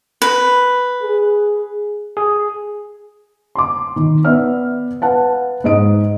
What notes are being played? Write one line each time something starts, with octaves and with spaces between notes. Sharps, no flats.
B4
G#4
G#4
C6 D6
D#3
B3 D5 E5 F6
B4 F5 F#5 A5
G#2 D#5 D7